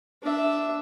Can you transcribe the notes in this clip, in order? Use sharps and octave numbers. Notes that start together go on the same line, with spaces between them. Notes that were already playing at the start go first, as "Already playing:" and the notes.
D4 E5